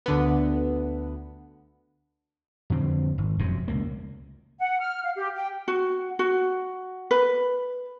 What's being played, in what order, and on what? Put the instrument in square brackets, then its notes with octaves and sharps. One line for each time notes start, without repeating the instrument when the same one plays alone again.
[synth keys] D2 D3 B3
[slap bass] F2 D3 C4
G#1
F1 F#2 C3
C#2 A#3
[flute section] F#5
F6
F5
G4
G5
[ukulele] F#4
F#4
B4